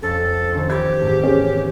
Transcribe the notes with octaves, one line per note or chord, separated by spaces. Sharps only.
F2 C#4 A4 A6
D#3 C#4 C5
G4 G#6
E2 G#2 A3
C#4 G#4